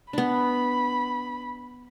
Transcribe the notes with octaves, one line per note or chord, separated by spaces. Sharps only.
B3 D4 B5